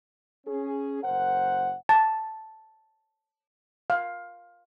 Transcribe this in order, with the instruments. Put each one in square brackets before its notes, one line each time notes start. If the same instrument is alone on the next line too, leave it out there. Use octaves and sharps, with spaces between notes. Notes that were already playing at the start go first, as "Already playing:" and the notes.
[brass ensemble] C#4 G#4
F#1 A#4 C5 F#5
[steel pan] A5
F5